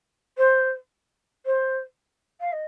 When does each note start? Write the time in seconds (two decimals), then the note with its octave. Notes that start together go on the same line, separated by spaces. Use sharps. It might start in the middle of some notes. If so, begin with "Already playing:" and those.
0.38 C5
1.46 C5
2.40 F5
2.52 D#5